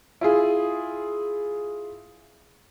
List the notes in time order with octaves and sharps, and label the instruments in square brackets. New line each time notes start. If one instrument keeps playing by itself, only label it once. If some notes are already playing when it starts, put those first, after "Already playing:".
[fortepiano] E4 F4 G#4